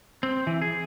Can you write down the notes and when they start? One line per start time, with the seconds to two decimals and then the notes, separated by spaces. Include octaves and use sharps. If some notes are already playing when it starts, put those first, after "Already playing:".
0.23 C4
0.47 E3
0.62 G#4